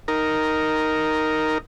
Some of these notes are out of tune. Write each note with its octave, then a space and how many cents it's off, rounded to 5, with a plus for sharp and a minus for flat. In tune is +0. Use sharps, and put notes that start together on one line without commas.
D#4 +0 A#4 +0